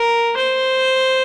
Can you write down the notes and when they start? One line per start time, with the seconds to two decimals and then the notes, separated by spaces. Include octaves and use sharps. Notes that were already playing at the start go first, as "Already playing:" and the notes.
Already playing: A#4
0.37 C5